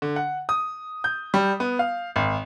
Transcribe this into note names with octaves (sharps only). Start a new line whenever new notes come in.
D3
F#5
D#6
G6
G3
B3
F5
G#1